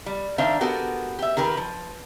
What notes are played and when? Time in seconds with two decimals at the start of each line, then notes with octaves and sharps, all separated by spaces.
0.06 G3
0.38 D#3 D4 C5 E5 F5
0.61 B3 F#4 G4 A4 A#4
1.19 G4 E5
1.37 D#3 G4 A#4 B4
1.57 F3